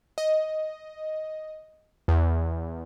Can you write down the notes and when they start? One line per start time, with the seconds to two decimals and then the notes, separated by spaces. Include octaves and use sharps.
0.18 D#5
2.08 E2